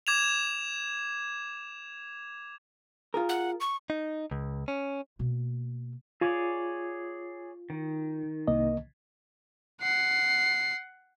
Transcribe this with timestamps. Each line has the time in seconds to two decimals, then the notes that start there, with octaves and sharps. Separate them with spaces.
0.07 D6 G#6 E7 F7
3.14 F4 G#4 A#4
3.29 F#5
3.60 C#6
3.90 D#4
4.31 C#2
4.68 C#4
5.19 B2 A#3
6.21 F4 G#4 C#5 D5
7.70 D#3
8.48 C2 A#3 D#5
9.81 F#5 C7